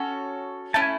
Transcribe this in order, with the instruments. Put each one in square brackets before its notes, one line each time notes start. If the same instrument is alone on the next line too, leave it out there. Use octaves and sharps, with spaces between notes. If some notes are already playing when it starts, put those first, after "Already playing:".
Already playing: [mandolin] C#4 F#4 A4
[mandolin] A3 C#4 E4 [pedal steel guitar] A5
[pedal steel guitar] G#5